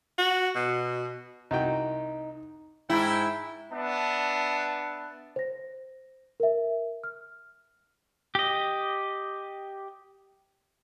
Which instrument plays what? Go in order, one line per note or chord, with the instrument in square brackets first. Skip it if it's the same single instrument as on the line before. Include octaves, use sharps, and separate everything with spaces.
[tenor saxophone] F#4
B2
[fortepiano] C2 F#4 G5 [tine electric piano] D#4
[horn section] G#2 G5 [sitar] E4
[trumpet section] B3 D4 E5 A5
[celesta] C5 A#6
A#4 E5
F6
[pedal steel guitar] G4 D#5